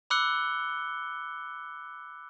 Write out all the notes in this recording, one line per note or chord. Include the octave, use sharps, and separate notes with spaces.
B5 D6 E6 F#6 C#7 G7